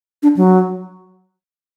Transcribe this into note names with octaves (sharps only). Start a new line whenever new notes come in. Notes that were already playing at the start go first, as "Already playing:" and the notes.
D4
F#3